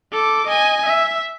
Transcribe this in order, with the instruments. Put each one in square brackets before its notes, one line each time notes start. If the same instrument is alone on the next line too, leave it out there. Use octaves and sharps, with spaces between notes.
[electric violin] A4 D6
D#5 G#5
E5